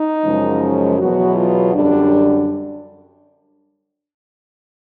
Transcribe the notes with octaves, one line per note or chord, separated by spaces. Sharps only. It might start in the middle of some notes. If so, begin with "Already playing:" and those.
Already playing: D#4
F#2 C#3 F3 G#3
E2 B2 F#3 F#4
F4
F#2 D3 G3 D4